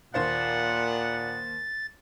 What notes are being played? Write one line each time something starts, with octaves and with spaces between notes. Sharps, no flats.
D#2 A#2 B3 D4 C5 F5 F#5 A6